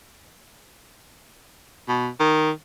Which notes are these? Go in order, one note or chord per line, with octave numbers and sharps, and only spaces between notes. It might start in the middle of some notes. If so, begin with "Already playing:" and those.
B2
D#3